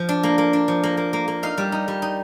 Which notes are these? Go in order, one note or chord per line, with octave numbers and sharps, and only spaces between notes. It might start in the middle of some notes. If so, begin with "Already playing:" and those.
Already playing: F3
D4
A#3
A#3
D4
F3
A#3
A#3
A#3
A#3
D#4 F5
G3
D#4
G3
D#4